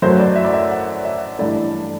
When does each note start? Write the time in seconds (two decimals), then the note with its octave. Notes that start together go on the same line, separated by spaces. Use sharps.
0.02 F#2 F#3 A3 C5
0.20 D5
0.36 E5
0.45 D5
0.54 E5
0.71 F#5
1.05 E5
1.39 G2 E3 A3 D5